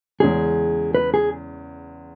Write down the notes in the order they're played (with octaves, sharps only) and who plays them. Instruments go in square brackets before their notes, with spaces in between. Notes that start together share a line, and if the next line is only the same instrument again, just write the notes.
[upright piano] E2 C#3 G#3 C#4 [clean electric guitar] G#4
[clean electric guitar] B4
G#4